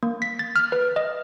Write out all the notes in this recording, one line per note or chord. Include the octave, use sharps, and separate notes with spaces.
A#3
B6
A6
F6
B4
D#5